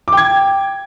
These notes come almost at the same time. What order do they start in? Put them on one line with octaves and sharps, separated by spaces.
D6 G5 G#6